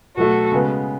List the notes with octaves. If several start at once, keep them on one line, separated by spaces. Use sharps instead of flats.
B2 F#3 A3 F#4 A4
C#3 G#3 B3